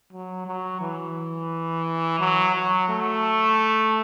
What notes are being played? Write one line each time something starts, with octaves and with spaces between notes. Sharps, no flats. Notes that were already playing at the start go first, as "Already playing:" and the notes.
F#3
F#3
E3
F#3
F#3
A3